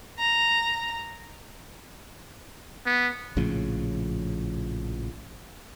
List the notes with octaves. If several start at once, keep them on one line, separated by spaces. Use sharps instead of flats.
A#5
B3
A#1 A2 C#3 F3